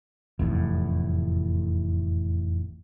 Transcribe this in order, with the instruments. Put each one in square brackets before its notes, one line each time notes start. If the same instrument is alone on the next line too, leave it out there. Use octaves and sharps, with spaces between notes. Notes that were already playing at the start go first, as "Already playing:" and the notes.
[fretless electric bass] F1 E2 A2